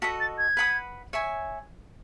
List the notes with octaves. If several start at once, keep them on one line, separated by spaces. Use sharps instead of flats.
F#4 A4 D#5 B6
A6
G#6
B4 F#5 B5 D#6
C#5 E5 G#5